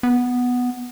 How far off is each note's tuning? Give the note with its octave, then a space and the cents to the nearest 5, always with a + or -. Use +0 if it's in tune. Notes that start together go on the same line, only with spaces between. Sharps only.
B3 +0